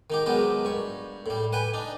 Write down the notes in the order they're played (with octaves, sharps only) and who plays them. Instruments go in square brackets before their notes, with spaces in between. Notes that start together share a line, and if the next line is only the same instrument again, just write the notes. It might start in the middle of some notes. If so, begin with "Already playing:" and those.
[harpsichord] D#3 D#4 G4
F#3 G#3 B3 G4 A#4
G2 C#6
A2 G3
B4 G5 G#5
D4 D#4